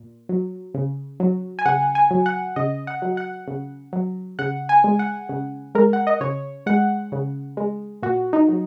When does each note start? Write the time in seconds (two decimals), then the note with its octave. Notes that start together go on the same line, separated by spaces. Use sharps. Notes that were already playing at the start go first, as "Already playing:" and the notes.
Already playing: A#2
0.29 F#3
0.74 C#3
1.20 F#3
1.59 G#5
1.65 C#3 F#5
1.95 G#5
2.11 F#3
2.26 F#5
2.56 C#3 D#5
2.87 F#5
3.02 F#3
3.17 F#5
3.48 C#3
3.93 F#3
4.39 C#3 F#5
4.69 G#5
4.84 G#3
4.99 F#5
5.29 C#3
5.75 G#3 A#4
5.93 F#5
6.07 D#5
6.21 C#3 C#5
6.66 G#3 F#5
7.12 C#3
7.57 G#3
8.02 A#2 F#4
8.33 D#4
8.48 F#3